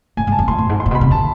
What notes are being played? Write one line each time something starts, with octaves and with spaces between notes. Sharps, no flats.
A2 G#5
G#2
A5
F2
A2 C6
A2
F2
G#2
C6
A2
B2
B5
C3
D3 A5